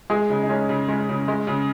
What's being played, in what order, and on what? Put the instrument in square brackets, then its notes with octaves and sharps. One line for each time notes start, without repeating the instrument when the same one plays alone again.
[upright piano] G#3 G#4
C#3 D#4
D#4
G#3 C#4
C#3
G#3
C#3
G#3
C#3